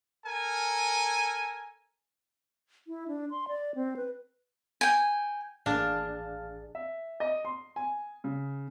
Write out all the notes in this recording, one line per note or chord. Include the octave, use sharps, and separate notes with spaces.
A4 A#4 G#5
E4
D4
C6
D5
C4
B4
G5 G#5
A1 A2 A#3 D4 G#4 F5 A5 A6
E5
D#5
C6
G#5
C#3